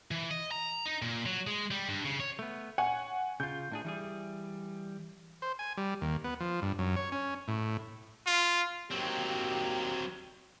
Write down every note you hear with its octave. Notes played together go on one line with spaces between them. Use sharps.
E3
D#5
A#5
D#4
A#2
F#3
G#3
G3
G2
C#3
C#5
A3 B3
C#5 F#5 G#5
C#3 F4 G6
A2 D4 G#4
E3 G3 G#4
C5
G#5
G3
D#2
B3
F3
G2
F#2
C#5
C#4
A2
F4
F#3 A#3 C4 D#4 G4